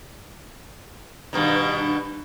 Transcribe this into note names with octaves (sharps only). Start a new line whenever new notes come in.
G2 B2 D#3